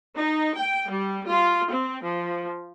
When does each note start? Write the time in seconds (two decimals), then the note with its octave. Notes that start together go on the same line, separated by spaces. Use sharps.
0.16 D#4
0.58 G5
0.91 G3
1.29 F4
1.72 C4
2.04 F3